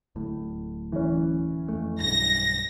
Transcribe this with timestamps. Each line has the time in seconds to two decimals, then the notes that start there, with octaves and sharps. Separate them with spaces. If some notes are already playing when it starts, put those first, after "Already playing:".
0.16 D1 A2
0.92 E3 C#4
1.69 F2 A3
2.00 B1 G2 A#6